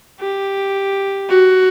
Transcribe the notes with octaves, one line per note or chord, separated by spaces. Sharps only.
G4
F#4